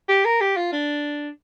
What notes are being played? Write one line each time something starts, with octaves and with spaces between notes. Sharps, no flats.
G4
A#4
G4
F4
D4